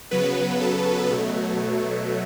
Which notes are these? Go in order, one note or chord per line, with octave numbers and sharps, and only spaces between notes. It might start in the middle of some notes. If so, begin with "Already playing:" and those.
C#3 F#3 B3 B4
A4
B2 F#3 A3